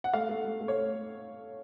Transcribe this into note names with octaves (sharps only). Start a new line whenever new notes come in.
F#5
A3 F5
A3
A3
A3
C#5